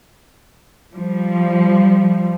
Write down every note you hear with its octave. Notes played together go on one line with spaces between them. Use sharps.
F3 G3